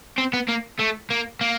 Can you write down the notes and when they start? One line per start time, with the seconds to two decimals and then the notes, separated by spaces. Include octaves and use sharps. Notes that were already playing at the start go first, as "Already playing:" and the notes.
0.18 C4
0.33 B3
0.49 A#3
0.80 A3
1.11 A#3
1.41 A#3